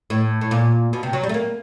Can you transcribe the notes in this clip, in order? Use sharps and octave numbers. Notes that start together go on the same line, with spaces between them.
A2
A2
A#2
B2
C3
F#3
G3
A3
A#3